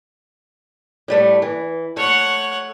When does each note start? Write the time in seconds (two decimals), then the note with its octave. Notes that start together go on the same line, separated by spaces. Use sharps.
1.08 A2 G3 A3
1.42 E3
1.97 A3 C#5 F#5